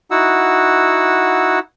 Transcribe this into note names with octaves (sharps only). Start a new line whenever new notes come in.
D#4 E4 F#4 F#5 E6